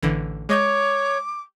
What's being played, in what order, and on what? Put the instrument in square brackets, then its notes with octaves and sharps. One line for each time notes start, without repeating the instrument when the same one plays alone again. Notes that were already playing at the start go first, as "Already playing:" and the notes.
[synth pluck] A1 D3 E3
[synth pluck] G#3 D#5 G6 [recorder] C#5 [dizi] D6